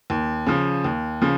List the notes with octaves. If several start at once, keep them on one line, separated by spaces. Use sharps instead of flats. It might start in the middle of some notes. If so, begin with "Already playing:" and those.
D#2
C#3 F3
D#2
C#3 F3